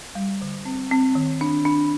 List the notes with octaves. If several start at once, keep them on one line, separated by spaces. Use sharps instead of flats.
G3
D3
C4
C4
D#3
D4
D4